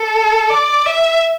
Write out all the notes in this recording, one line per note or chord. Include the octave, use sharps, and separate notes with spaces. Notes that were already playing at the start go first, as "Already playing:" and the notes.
Already playing: A4
D5
E5